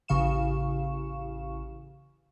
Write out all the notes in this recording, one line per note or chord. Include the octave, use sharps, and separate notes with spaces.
A1 C#3 F5 C#6 E7